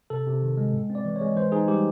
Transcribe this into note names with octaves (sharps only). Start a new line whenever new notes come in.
C3 A4
C3
D#3
G#3
A2
C4
D5
E3
G#3 C#5
E3 C5
D#4 G#4
G3 G4